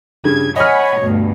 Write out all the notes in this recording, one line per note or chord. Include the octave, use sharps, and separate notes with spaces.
G2 C#3 G#6
C#5 D#5 F#5 G#5 B5 F6
D2 G2 B2